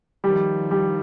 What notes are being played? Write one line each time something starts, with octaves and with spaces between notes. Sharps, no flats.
D#3 F3 G3
G3